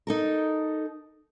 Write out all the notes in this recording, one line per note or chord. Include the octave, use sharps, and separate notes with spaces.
D#4 A4 A#4